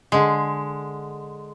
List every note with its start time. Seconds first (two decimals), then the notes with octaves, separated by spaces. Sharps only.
0.12 D3 G#3